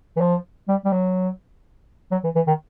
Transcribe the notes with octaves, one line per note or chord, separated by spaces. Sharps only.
E3
F3
G3
G3
F#3
F#3
E3
E3
D#3